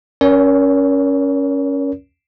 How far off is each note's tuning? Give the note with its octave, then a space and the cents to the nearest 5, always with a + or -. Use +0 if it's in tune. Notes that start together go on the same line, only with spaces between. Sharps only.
C#4 +0 A#4 +25 C#5 +45